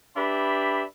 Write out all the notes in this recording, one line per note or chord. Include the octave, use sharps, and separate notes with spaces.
D4 G4 B4 E5 B5